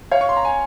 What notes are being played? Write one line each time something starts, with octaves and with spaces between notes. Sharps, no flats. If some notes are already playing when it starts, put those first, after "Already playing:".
C#5 F5
C#6
C6
A#5
G#5